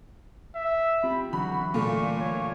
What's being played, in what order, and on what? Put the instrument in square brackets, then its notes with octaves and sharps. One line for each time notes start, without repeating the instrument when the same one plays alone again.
[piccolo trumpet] E5
[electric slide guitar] C4 F4 G4 [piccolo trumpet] B5
[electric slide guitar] D3 E3 F#3 [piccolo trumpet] F#4 [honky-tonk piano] B5
[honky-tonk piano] A#2 A3 [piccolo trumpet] C#6
[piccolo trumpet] C#5